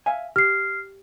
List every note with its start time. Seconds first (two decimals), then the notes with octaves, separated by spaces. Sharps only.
0.06 E5 F5 G#5
0.36 G4 F6 C7